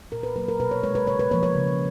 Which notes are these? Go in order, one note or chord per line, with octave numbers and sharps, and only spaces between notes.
A#2 A#4
B4
F#3 A#3 B4
A#4
B2 B4
C#5
G#3 C#5
B4
C#3 C#5
B4
F3 A#3 C#5
C#5
C#3